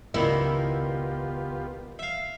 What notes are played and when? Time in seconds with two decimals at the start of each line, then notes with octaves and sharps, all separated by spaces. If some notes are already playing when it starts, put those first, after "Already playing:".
0.14 C#2 A#2 D#3 A#3 B3 E4 F4 G4
1.99 E5 F5